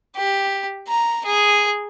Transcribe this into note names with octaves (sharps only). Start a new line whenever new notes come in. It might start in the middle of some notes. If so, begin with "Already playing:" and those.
G4
A#5
G#4